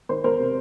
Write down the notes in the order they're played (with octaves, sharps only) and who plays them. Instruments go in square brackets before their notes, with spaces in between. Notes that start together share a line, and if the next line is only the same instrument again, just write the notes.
[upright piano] D#3 A#4 C5
E2 A#4 C5
C3